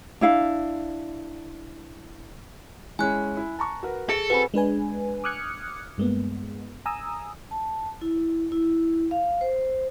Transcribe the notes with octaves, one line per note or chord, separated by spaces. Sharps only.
D4 E4 F5
G#3 C#4 E4 G#5 F#6
E4
A5 A#5 C#6
F#4 A#4 B4
G#4 A4
C4 F#4 B4 G#5 B5
G#3 D4 B4 G#5
D6 D#6 F6 F#6 G#6 C#7
G2 G#3 A#3 B3
G#5 A#5 D#6 E6
A5
E4
E4
F5
C5